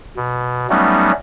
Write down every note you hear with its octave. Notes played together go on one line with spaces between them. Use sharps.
B2
F#3 G3 A3 B3 C#4 D#4